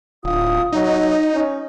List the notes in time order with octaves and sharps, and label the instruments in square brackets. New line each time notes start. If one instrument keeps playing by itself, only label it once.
[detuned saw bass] D1 [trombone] F4 [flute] D#6
[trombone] F#3 [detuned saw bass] D#4 [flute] D#5
[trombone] C#4